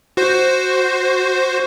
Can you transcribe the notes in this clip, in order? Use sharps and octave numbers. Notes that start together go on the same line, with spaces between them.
F#4 C5